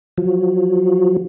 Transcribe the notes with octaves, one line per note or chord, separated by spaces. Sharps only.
F3 F#3